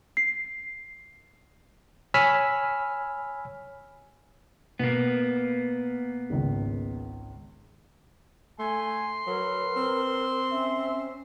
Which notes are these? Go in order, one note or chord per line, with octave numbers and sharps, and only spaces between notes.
C7
C#5 G#5 B5 E6 F6 B6
B2 A#3 B3
G#1 C#2
A3 G#5 C6
F#3 A#4 B4
C4
C#4 E5